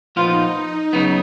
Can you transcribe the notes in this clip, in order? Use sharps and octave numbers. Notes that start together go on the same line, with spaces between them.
A#2 F3 B3 D#4 F4
C#3 F#3 B3 D#4